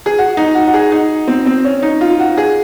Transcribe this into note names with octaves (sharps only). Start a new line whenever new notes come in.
G#4
F#4
D#4
F#4
F#4
G#4
D#4
C4
C4
C#4
D#4
F4
F#4
G#4